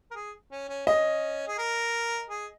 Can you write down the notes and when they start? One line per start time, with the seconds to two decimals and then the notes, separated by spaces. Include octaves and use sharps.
0.11 A#4
0.16 G#4
0.52 C#4
0.69 C#4
0.87 C#4 D#5
1.48 G#4
1.58 A#4
2.30 G#4